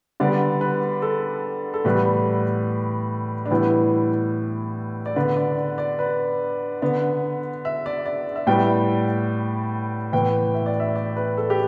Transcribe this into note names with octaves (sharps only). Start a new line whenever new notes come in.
D3 G3 B3 D5
B4
A4
A4
A2 E3 G3 B3 B4
D4
A2 E3 G3 B3 E4
D5
D3 B3 B4
D5
D5
B4
D3 B3
E5
D5
D5
E5
A2 G3 B3 G5
A2 E3 B3 G5
E5
D5
E5
D5
B4
A4
G4